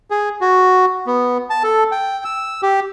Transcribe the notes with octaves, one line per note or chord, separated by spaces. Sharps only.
G#4
F#4
B3
A5
A4
G5
E6
G4